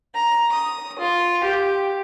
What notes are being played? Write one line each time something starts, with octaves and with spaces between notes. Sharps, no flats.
A#5
D#6
F4
G4